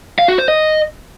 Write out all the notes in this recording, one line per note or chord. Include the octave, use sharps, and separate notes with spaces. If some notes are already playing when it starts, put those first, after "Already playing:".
F5
F#4
C5
D#5